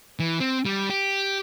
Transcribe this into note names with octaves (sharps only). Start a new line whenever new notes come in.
E3
C4
G3
G4